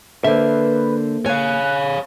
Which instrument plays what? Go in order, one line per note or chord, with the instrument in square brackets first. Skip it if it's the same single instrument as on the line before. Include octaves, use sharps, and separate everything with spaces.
[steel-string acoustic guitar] D3 C5 [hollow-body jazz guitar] A#3 E5 [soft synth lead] B4
[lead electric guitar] C#5 F5 [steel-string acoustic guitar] G#5 [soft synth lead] F#6